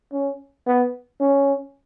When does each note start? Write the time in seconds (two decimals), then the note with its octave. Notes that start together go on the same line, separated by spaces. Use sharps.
0.13 C#4
0.67 B3
1.21 C#4